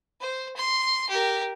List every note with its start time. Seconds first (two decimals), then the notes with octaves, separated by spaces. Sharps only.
0.20 C5
0.56 C6
1.09 G4 A#4